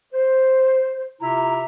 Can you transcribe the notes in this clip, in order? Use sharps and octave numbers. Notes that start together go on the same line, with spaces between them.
C5
C3 E4 F4 E5 A#5